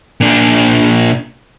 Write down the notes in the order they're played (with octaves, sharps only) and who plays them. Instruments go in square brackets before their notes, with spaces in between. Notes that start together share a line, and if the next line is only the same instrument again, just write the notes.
[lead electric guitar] A#2 D4